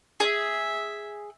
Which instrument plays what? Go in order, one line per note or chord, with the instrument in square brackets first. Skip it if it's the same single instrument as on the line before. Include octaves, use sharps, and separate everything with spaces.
[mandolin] G#4 [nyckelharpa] E5